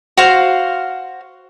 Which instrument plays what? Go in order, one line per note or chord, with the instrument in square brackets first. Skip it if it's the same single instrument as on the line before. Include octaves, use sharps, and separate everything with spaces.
[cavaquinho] F#4 C5 F5